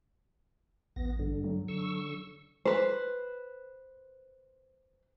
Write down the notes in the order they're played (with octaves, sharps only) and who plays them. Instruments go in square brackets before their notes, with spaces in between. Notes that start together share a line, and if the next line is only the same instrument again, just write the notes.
[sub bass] A1 [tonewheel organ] B3 A#6
[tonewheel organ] G2 D3
[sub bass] F#3
[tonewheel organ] D3 C#6 E6
[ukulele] B4 C5